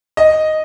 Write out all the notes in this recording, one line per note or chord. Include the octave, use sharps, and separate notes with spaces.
D#5